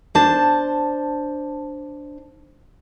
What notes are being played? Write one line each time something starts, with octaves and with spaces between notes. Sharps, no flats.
D4 C5 A5